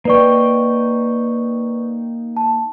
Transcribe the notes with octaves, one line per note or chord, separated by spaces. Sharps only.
A#3 D#4 B4 D5 G5 C#6
A5